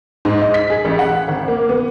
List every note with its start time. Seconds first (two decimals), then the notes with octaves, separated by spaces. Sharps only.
0.25 G#2
0.42 D#5
0.54 B6
0.70 G#4
0.85 A1
0.99 F#5
1.28 G#1
1.48 A#3
1.69 B3